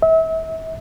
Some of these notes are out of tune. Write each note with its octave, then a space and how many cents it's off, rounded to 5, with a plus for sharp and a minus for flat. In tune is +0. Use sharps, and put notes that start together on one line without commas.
E5 -35